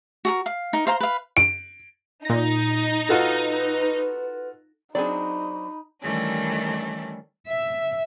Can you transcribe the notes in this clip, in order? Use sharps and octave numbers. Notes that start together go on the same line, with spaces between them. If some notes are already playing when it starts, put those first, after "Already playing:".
F#4 G#4 A#4
F5
D#4 A#4
C5 F5 A#5 C6
B4 F5
D7
A#2 D#4 A#6
F4 F#4 A4 B4
F#3 C4 D4 D#4 G#4 D5 B5
D#3 E3 G3 A3 C#4 D4
E5